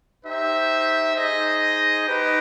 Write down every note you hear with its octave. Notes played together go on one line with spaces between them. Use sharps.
D#4 G4 C5 E5 G5
D#4 G#4 C5 D#5
D#4 G4 B4